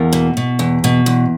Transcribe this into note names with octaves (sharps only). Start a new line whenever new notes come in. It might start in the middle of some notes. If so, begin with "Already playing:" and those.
Already playing: E2 A#3
B2
B2
E2
B2
E2